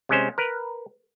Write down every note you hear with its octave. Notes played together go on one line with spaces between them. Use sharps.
C3 G#3 C#4 C5
A#4 B4